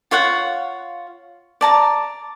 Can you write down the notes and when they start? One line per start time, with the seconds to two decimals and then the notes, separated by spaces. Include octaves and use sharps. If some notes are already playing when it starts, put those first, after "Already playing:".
0.11 F4 C#5 F5 F#5
1.61 D5 A5 A#5